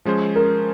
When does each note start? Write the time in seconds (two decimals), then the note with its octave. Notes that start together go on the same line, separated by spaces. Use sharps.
0.05 F3 G#3 C#4 G#4 C5
0.36 A#4